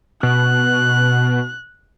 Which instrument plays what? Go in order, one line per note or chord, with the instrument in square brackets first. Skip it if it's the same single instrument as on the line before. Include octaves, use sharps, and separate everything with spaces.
[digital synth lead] B2 [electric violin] F#6